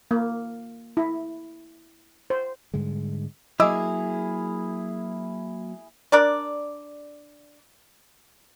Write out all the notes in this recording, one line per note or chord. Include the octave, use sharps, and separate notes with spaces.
A#3
E4
C5
G#2 D3 G3 G#3
F#3 A#3 E4 G#4 D#5 D6 E6
D4 A#4 D5